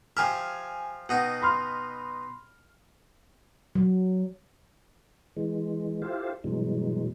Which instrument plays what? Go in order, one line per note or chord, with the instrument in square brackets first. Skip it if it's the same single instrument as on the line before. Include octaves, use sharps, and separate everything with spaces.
[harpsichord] F3 G4 E5 [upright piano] G#5 F6
[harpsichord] B2 D#4 G5 [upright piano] F#5
[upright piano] B5 C6 F6
[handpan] F#3
[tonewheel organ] E3 G#3
E4 F4 G4 A4 C5 F5
G2 B2 E3 F#3 G#3